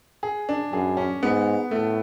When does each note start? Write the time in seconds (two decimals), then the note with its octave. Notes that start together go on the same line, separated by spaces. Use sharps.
0.23 G#4
0.49 D4
0.73 F#2 G#4
0.97 C#4
1.23 G#2 B3
1.71 A2 A3